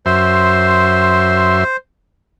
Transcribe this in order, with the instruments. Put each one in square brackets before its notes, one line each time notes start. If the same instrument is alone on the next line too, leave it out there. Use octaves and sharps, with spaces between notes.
[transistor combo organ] F#2 E5 C6 [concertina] C5